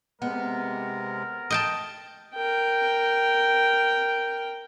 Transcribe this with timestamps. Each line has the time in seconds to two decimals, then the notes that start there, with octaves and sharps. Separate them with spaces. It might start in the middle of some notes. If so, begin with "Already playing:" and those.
0.22 C3 G#3 B3 A#4
1.50 D#5 G5 A5
2.35 A#4 G5